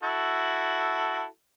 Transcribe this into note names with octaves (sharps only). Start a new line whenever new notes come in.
E4 F#4 A4